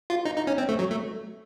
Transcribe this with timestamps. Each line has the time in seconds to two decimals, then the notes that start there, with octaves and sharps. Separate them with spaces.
0.10 F4
0.25 D#4
0.36 D#4
0.47 C#4
0.58 C4
0.69 A3
0.79 F#3
0.91 A3